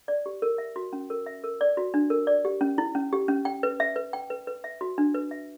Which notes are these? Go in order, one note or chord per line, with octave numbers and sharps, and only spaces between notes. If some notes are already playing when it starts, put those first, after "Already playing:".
D5
G4
A#4
E5
F#4
C#4
A#4
E5
A#4
D5
F#4
D4
A#4
D5
G4
C#4
E4
C#4
G4
C#4
G5
B4
E5
B4
G5
B4
B4
E5
F#4
D4
B4
E5